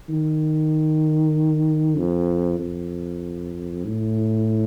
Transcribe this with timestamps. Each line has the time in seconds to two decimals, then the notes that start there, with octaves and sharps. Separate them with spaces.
0.09 D#3
1.96 F2
2.59 F2
3.85 A2